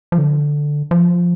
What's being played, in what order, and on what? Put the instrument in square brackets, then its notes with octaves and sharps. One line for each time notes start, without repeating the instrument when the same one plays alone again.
[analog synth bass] F3
D3
F3